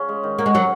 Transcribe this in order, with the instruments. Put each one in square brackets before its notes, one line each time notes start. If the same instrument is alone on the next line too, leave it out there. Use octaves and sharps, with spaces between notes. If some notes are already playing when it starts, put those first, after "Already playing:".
Already playing: [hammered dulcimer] C#3 C#4 F4
G#3
D#3
[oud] A#3 [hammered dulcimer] F#4
[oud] G#3
[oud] F#3 [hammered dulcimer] C#4